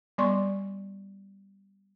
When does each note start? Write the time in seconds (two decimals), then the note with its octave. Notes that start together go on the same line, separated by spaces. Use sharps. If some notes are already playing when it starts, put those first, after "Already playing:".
0.18 G3 B3 D5 C6 C#6